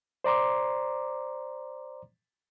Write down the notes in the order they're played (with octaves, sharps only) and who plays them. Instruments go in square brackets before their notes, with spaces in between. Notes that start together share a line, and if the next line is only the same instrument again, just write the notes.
[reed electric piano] C5 D5 A#5 C6 D6